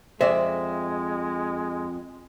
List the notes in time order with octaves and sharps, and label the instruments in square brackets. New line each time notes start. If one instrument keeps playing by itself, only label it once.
[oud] F2 D5 [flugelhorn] G#3 [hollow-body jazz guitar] C5 E5